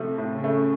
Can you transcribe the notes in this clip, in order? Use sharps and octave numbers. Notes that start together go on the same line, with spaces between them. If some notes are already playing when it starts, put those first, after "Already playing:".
Already playing: A2 C3 F3 A3
A2
C#3
A3